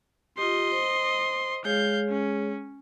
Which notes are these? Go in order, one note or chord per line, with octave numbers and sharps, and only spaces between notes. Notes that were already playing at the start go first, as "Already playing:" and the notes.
F4 G4 D#5 C6
C5
G#3 G#4 C#5 F5 G6
C#4